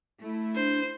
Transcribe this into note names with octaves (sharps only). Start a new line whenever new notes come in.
A3 E4
D4 C5